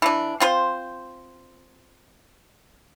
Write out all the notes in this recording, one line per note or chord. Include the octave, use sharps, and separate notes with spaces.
E3 D4
C4 F4 C5